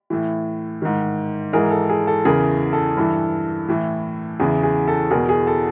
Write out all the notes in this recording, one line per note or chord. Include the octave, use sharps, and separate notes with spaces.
A2 E3
G#2 D#3
G#2 E3 G#4 A#4
A4
G#4
A4
E2 C#3 E3 G#4 A#4
A4
G2 E3
A2 E3
E2 C#3 E3 G#4
G#4
A4
E2 B2 G#4 A#4
G#4
A4